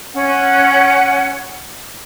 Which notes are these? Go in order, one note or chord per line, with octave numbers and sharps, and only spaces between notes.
C#4 F#5